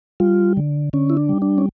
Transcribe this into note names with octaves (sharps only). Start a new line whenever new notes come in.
G3 F4
D3
D3 C#4
E4
D4
G3
D4
C#4